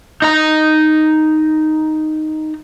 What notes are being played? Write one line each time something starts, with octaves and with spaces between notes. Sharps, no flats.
D#4 A#5